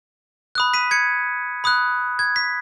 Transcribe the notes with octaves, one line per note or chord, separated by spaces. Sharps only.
B5 D#6 F#6
B6 D#7
G#6 C#7
B5 D#6 F#6
G#6
B6